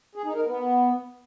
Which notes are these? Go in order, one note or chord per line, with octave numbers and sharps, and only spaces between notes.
G#4
D#4
A#4
B3